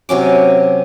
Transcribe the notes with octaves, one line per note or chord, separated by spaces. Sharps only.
C3 F#3 C#4 D6